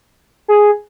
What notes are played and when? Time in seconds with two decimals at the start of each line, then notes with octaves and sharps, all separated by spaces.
0.48 G#4